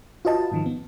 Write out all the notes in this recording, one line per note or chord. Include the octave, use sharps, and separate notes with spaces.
F4 F#4 B4 D#5 A5
G#2 D#3 F3
B3